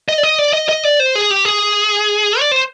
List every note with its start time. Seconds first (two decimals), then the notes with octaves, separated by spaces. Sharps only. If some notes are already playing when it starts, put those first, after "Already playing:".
0.09 D#5
0.18 D5
0.23 D#5
0.39 D5
0.53 D#5
0.69 D#5
0.84 D5
1.00 C5
1.15 G#4
1.31 G4
1.45 G#4
2.40 D5
2.52 C5